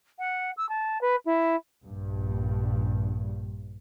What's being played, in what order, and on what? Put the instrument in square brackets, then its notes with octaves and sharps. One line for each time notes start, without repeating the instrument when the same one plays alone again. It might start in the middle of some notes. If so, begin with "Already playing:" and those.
[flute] F#5
E6
A5
B4
E4
[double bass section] A#1 G2